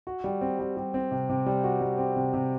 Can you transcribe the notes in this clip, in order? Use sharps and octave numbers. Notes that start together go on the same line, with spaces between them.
F#4
G3
C4
G3
G3
C4
C3
C3
G3
F#4
G3
C4
C3
C3